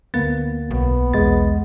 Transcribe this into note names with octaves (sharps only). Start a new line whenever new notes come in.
D2 A#3 B3 A6
B1 B3
B1 E2 G#3 A6